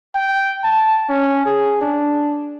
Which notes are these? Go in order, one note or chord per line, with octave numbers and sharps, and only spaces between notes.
G5
A5
C#4
G#4
D4